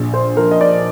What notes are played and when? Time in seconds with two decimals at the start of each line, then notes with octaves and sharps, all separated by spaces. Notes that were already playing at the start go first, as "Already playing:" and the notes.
Already playing: A#1
0.14 C5
0.37 F3 A#4
0.51 D#5
0.61 D5